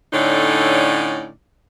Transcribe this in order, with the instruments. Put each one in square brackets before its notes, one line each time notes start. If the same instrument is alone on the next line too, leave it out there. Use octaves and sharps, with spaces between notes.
[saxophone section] A2 D3 C#4 D#4 D5